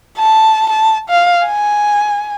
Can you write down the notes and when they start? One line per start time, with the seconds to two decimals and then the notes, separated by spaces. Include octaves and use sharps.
0.18 A5
0.69 A5
1.09 F5
1.46 G#5